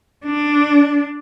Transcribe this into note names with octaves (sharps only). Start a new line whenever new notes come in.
D4